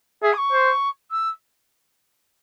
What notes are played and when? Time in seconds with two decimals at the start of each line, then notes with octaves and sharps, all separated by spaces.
0.22 G#4 E5
0.33 D#6
0.37 C#6
0.52 C5
1.11 E6